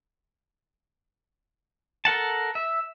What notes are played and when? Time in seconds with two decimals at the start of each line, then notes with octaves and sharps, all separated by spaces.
2.05 A4 A#4 F#5 A5
2.55 E5